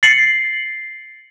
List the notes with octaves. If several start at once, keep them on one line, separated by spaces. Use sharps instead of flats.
A6 C7 C#7 F#7